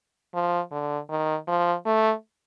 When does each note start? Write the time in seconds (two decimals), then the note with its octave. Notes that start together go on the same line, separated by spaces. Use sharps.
0.34 F3
0.71 D3
1.09 D#3
1.48 F3
1.86 A3